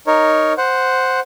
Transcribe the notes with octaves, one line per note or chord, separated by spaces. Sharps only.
D#4 A#4 C#5
C5 F#5